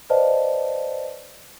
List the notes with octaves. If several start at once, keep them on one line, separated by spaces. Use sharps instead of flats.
B4 C5 D5 D#5 F5 A5